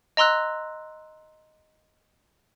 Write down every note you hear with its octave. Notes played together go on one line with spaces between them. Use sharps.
D#5 A#5 C6 E6 F#6